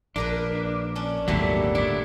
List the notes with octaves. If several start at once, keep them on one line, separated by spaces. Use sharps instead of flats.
A#1 A#3 D4 A#4 B4
C#4 D4
G#1 D#2 A#2 D3 F#3 G3 A3
A3 D4 E4